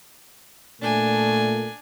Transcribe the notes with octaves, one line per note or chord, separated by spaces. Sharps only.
A#2 A3 D4 G#5